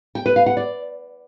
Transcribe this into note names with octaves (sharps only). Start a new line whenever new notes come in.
G5
B4
F5
F#5
D5